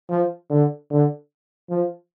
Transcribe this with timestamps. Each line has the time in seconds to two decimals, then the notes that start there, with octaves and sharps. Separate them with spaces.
0.10 F3
0.50 D3
0.91 D3
1.70 F3